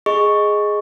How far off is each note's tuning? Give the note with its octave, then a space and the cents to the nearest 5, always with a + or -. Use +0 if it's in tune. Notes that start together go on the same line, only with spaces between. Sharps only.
G#4 +0 D#5 +0 C#6 +0